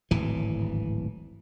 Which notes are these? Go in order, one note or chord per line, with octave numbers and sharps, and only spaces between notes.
D1 G#1 E3